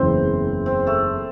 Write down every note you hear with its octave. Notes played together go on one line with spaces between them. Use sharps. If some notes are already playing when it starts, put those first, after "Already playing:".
Already playing: F#1 E2 C#3 E3 C4 C5
C4 C5
A3 A4